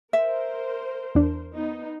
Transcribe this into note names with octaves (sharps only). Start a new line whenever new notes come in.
A#4 C5 E5
E2 D4
B3 D#4